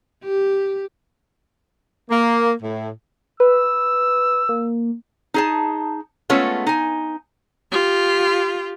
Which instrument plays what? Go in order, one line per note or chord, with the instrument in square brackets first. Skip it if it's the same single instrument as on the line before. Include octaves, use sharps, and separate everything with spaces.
[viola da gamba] G4
[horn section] A#3
A2
[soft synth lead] B4 [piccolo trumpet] E6
[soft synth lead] A#3
[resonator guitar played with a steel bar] D#4 G#4 A5
G#3 A3 B3 C#4 F4 A4
D#4 G#5
[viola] F4 G4